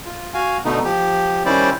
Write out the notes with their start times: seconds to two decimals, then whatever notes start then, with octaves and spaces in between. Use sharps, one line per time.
0.06 F4
0.34 F#4 F5 G#5
0.65 B2 D3 A3 B3 D#4
0.84 F3 G4
1.45 D#3 G3 C#4 E4 C5 D5